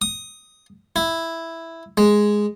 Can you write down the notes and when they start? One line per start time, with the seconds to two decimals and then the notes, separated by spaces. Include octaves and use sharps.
0.02 D#6
0.96 E4
1.98 G#3